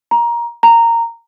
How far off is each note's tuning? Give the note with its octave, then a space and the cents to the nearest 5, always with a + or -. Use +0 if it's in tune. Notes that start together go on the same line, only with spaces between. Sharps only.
A#5 +15
A#5 -10